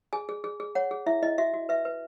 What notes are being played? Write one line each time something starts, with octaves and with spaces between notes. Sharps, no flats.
G#4 G#5
G#4
G#4
G#4
C#5 F#5
G#4
E4 E5
E4 D#5
F#4 E5
F#4
B4 E5
B4